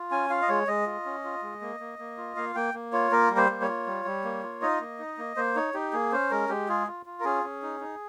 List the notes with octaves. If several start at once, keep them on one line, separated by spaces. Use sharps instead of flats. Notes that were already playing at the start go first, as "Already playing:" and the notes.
Already playing: F4
C#4 G#5
F4 F5
D#5
G#3 C#5
G#3 D#5
F4
C#4
F4
G#3
A#3
A#3
A#3
F4
A#3 F5
A#3 G5
A#3
F4 C#5
A#3 A#4
G3
C5
A#3
C#5
F4
G3
G3
A#3
F4
D#4 D#5
A#3
D#4
A#3
A#3 C5
D#4 C#5
D#4 G4
A#3 G#4
C#4 C5
G#3 A#4
G#3 G4
F4 G#4
F4
F4
A#4
C#4 G#4
C#4
D#4
D#4